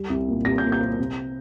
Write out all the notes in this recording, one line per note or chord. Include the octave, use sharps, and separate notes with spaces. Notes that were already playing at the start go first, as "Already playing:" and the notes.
Already playing: G3
C2
A#2
C2 A#6
G6
A#2
G6
C4
C3